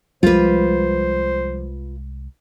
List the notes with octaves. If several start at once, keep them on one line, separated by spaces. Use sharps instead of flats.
C2 F3 G3 G#3 F4 B4 C5